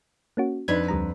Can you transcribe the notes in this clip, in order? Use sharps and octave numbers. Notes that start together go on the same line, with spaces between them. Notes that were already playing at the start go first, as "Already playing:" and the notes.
A#3 C#4 F#4
F2 D4 D#4 B4 G#6
D2 G3 A#5